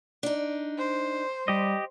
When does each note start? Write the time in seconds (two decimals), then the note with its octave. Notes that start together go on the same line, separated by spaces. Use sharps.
0.23 D4 D#4
0.78 C5
1.48 G3 G4 D#5